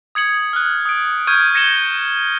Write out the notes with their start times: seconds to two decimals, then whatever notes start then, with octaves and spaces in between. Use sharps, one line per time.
0.15 D#6 G#6 C#7 F#7
0.53 F6 F#6
0.85 D#6 D7
1.27 C#6 F6 G6 G#6 D#7
1.54 G#6 A#6 C#7 D#7 E7 G7